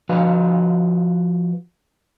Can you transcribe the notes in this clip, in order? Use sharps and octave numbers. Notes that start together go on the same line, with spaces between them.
F3 F#4 B4 D#5 F5